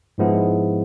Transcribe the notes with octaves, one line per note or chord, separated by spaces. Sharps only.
G#2 F3 G#3 B3 E4